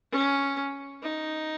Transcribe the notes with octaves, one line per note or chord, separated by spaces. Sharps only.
C#4
D#4